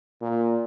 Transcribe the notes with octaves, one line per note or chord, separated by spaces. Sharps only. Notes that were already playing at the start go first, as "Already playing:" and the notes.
A#2